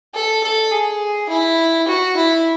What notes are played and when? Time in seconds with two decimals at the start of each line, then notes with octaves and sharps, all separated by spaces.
0.15 A4
0.43 A4
0.71 G#4
1.29 E4
1.87 F#4
2.16 E4